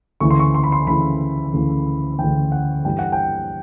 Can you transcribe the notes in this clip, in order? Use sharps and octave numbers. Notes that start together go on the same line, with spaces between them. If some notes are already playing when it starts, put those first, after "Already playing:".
D2 C#3 E3 C#6
C6
C#6
C6
B5
C6
D2 C#3 E3 B5
D2 C#3 E3
D2 C#3 E3 G5
F#5
G2 E3 G3 G5
F#5
G5